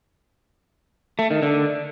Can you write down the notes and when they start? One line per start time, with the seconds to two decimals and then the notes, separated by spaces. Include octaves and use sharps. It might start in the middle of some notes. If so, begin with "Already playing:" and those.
1.19 A3
1.31 D#3
1.42 D3